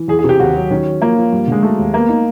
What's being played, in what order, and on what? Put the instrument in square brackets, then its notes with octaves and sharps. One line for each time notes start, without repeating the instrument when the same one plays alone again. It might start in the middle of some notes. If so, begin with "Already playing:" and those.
Already playing: [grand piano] E3
[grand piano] E2 [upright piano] G#4
[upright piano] G#4
[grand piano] C3 [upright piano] G4
[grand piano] D#2 [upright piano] F#4
[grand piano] F#3
[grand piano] D#3 [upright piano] C#4
[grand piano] F#3
[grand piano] F3 [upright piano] A#3
[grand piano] F3
G2
[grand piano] D3 [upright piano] G#3
[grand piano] F#3 [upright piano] A3
[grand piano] D#2
[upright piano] A#3 [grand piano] B3
[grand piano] D#4